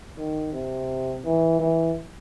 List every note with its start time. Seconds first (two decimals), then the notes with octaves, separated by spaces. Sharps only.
0.18 D#3
0.53 C3
1.25 E3
1.60 E3